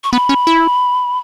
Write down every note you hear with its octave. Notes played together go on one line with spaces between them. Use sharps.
C#6
B3 B5
C#4
E4